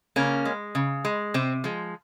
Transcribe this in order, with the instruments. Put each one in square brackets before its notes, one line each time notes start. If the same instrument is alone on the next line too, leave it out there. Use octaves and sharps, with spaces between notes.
[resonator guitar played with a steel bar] C#3 A#3 C#4
G#3
C#3
G#3
C3 C4
F3 G#3